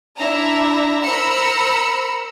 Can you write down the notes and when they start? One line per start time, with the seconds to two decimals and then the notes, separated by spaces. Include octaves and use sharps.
0.18 D4 E4 E5 A#5
1.03 A#4 C5 B5 E6 C#7